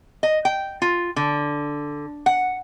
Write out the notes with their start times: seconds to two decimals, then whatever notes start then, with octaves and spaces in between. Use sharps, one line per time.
0.23 D#5
0.45 G5
0.82 F4
1.16 D3
2.26 F#5